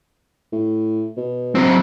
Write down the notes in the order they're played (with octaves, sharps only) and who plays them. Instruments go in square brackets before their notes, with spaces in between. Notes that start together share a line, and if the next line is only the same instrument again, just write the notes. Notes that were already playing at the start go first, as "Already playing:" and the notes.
[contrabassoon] A2
B2
[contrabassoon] F#1 [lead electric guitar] F#3 C4